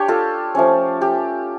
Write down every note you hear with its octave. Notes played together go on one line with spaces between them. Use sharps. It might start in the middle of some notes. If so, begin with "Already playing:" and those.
Already playing: D4 G4 C#5
F4 A4
F3 A3 C#4
G4